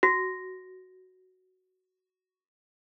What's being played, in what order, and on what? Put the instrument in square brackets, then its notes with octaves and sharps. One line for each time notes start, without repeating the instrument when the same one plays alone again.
[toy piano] F#4 [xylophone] A#6